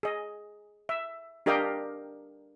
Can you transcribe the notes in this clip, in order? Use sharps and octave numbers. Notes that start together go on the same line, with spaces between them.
G#4 D#5
E5
D4 G4 A#4 D#5 F5 G5